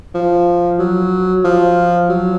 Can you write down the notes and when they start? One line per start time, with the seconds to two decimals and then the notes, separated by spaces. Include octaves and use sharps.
0.14 F3
0.79 F#3
1.44 F3
2.09 F#3